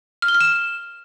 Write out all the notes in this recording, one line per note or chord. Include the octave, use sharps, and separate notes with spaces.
F6
G7
F6
E7